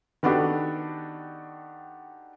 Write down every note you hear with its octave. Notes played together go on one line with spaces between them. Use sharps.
D#3 B3 D4 F#4 G4 A4